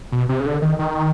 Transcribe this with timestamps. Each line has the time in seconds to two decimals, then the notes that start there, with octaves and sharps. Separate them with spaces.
0.12 B2
0.29 C3
0.40 C#3
0.46 D3
0.62 D#3
0.79 D#3